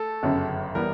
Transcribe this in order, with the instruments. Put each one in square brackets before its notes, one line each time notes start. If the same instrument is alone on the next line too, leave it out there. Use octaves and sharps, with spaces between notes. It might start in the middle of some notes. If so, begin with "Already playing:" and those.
Already playing: [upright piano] A3 [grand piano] A4
[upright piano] G1 F#2 C#3
[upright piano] E3 G3 B3 [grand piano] A#4